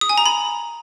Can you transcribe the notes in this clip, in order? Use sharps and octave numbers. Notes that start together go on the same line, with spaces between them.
D#6
G#5
A#5
B5